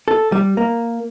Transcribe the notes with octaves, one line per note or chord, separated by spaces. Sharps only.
A4
G3
A#3